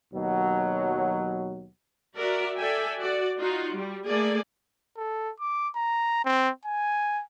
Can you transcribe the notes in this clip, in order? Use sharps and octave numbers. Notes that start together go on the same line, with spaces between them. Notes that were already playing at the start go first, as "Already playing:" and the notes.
D#2 B2 F#3
F#4 A#4 D5 E5
A4 D5 E5 G5 G#5
F#4 D5
D#4 F4 F#4
G3
A3 A#3 G#4 D5 G#5
A4
D6
A#5
C4
G#5